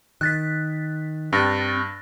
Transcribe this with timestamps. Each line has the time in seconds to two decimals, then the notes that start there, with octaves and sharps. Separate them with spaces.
0.21 D#3 F#6 A6 B6
1.33 G2 C4 F#6 A6 A#6